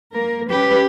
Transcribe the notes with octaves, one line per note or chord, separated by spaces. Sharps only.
A#3 A#4
C#4 G4 B4